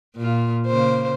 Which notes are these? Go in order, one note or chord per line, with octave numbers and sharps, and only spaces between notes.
A#2 F4
C#3 A#3 C5